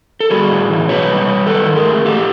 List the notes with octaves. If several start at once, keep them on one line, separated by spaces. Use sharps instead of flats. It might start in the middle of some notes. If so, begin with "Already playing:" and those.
A4
G3 F#4 G#4
A2
E3
B2 B4 C#5
G3
G3
D#3 A4 B4
D#3
G#4 A#4
A3
A2 G4 A4